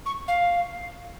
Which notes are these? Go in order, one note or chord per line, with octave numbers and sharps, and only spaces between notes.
C#6
F5